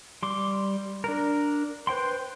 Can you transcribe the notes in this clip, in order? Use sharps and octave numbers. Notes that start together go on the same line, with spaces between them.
G3 C6 D6
D4 A#4
B4 C5 G5 C6